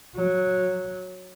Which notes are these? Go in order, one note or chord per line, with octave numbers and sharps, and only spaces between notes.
F#3